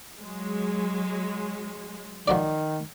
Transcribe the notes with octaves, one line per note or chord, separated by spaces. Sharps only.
F#3 G#3
D#3 F3 F#4 D5